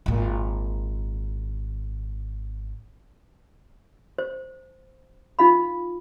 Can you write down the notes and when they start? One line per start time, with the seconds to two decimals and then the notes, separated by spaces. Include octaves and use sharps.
0.06 G#1 A#2
4.18 C5
5.39 D#4 F4 F5 B5